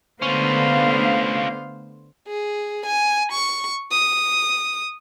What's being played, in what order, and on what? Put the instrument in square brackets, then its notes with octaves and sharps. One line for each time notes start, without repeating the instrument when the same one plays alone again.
[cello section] D3 A3 [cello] B3 F5 [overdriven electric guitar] C#4 F4 [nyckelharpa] C5
[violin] G#4
G#5
C#6
D#6